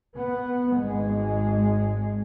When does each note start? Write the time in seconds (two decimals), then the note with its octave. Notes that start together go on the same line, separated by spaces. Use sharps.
0.17 B3
0.78 G#1 G#3